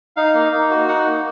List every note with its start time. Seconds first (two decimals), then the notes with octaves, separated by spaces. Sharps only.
0.16 D#4 F5
0.34 A#3
0.52 D#4
0.70 F#4
0.88 D#4 F#5
1.07 A#3